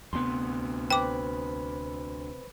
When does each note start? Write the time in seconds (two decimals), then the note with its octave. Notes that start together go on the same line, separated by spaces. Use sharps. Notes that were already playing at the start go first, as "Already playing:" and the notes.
0.13 D2 C3 B3 C6
0.91 B4 C5 G5 B5 D6